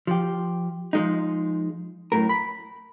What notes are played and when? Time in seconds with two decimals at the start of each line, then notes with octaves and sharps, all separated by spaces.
0.07 F3 G4
0.93 F3 G#3 D#4
2.12 F#2 A2 A#4
2.29 B5